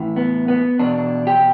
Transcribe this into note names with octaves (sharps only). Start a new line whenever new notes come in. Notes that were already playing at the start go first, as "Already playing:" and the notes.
Already playing: A2 E3
B3
B3
E2 B2 D4
G4